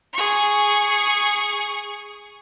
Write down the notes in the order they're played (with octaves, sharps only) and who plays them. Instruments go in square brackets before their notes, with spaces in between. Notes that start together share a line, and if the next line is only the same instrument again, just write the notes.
[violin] G#4 C#6